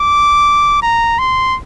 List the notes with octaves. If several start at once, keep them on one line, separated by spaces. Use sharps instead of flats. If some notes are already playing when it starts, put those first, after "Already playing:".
Already playing: D6
A#5
C6